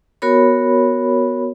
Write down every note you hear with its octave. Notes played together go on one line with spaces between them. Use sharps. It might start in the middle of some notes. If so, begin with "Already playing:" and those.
B3 F#4 A#4 C#5 B5